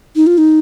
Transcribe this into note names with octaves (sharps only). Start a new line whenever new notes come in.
D#4
F4
D#4